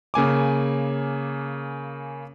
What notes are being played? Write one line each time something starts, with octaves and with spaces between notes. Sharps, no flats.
C#3 A#3 G#5 D6